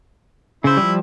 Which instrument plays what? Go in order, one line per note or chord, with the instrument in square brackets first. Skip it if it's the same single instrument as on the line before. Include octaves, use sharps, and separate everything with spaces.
[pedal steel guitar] C#3 C5 [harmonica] E4
[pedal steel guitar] F3 G3